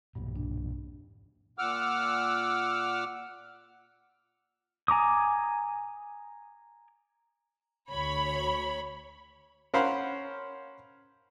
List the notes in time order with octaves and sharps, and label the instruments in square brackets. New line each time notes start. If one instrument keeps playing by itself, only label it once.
[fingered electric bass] B1 E2 A#2 [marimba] G2
[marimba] D4
[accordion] A#2 F#5 D6 E6 F6
[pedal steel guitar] G#5 A#5 D6 D#6
[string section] D2 C#5 B5
[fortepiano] C#4 A#4 C5 F5 F#5 B5